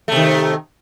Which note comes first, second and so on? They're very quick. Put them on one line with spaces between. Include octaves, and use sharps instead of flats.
A3 C3 D#3